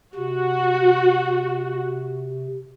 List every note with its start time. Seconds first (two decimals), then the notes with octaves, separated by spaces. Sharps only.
0.15 C3 F#4